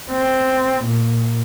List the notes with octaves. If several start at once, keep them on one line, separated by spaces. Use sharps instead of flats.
C4
A#2